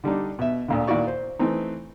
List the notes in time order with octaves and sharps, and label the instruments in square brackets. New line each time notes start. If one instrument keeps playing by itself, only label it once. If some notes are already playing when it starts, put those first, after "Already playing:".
[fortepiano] D3 G3 D4 D#4
B2 E5
D2 A#2 D3
A#2 D#3 E4 F#4 D5 C#6
C5
E3 A3 C4 D#4